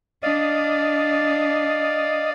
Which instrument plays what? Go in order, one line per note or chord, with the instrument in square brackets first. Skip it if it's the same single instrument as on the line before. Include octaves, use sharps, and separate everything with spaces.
[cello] D4 [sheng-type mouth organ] D5 F5 [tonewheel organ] D#5